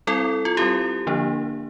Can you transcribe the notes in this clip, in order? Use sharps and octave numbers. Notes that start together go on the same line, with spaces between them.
G3 C4 E4 A4
F4
G3 C4 E4 G4
D3 F3 A#3 D4